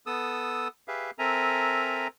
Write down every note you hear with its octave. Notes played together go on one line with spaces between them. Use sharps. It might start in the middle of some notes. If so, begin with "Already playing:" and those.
B3 A4 D#6 E6
G4 G#4 B4 E5 F5
C4 A4 A#4 E5 G#5 A#5